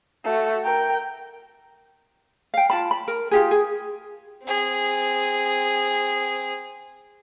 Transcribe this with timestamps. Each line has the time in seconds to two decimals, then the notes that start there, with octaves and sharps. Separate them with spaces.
0.24 A3 F#4
0.65 A#4 G5
2.54 F5 G5
2.70 F4 A5 B5
2.91 B5
3.08 A#4
3.31 F4 G4 G#4
3.51 G#4
4.43 C4 G#4